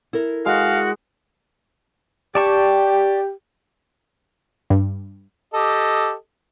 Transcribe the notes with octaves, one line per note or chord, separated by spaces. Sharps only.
E4 A4 A#4
G#3 F#4 F5
G4 D5 A5 C#6
G2
G4 A4 D#5